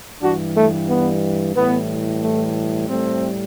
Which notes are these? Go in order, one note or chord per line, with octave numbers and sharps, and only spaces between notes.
G2 E3 G3 D4 F#4
A3
B3
A2 E3 G3 B3
A3
A2 G3 A3 C4